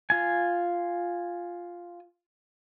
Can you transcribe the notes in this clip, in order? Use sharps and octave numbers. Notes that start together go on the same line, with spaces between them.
F4 G#5